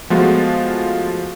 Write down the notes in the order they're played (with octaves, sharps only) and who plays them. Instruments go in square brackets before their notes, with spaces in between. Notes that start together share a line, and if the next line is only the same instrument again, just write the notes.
[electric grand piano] F3 G#3 A3 B3 F4 F#4